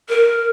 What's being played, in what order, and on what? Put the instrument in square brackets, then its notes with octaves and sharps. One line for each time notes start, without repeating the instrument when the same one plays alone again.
[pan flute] A#4